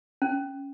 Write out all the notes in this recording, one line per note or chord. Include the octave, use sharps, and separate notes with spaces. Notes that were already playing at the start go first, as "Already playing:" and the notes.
C#4